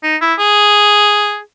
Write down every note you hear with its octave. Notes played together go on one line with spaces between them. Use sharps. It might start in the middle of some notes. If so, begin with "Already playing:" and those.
D#4
E4
G#4